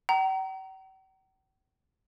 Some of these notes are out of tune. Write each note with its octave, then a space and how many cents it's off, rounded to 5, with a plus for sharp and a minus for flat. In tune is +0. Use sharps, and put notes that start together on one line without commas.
G5 -45 A#5 +0